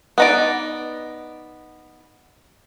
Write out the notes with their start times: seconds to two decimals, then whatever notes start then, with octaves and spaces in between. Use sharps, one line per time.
0.18 B3 D#4 D5